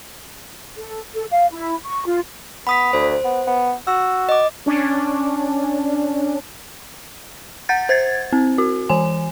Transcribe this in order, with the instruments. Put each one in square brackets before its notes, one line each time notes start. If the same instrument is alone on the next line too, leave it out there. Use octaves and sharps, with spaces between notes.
[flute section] A4
A4
F5
E4
C#6
F4
[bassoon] B3 [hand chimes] B5 D#6 B6
[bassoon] D2 [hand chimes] C5
[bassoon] B3
B3
[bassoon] F#4 [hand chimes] E6
[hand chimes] D#5 D6
[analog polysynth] C#4 D4
[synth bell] F#5 G6 A6
C5 G#6 A6
C4
F#4
E3 G#5